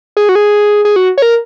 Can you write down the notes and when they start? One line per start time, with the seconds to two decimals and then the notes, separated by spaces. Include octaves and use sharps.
0.17 G#4
0.29 F#4
0.35 G#4
0.85 G#4
0.96 F#4
1.18 C#5
1.22 A#4